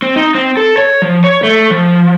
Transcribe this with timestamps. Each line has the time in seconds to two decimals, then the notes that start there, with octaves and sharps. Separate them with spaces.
0.02 C4
0.16 D#4
0.35 C4
0.57 A4
0.78 C#5
1.02 F3
1.24 C#5
1.43 A3
1.71 F3